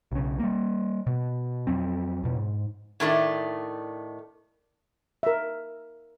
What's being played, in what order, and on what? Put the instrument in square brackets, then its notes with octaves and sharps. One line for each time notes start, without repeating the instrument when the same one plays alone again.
[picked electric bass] B1 C#3
G3 A#3
B2
F2 F#3 C4
F2 B2
G#2
[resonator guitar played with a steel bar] A2 D#3 A3 D4
[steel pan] A#4 E5